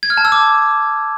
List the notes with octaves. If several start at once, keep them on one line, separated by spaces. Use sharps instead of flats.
G#6
F6
A5
E6
D6